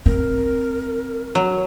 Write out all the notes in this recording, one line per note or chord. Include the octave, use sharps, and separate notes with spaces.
C4 A#4
F#3